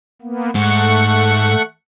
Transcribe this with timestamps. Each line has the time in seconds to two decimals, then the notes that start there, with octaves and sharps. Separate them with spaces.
0.22 A#3 B3
0.55 G#2 A3 F#5 C#6